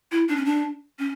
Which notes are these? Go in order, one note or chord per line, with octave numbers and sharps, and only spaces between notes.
E4
D4
C#4
D4
C#4